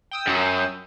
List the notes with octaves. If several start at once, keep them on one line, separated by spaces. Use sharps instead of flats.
G5 D#6 E6
F#2 F#3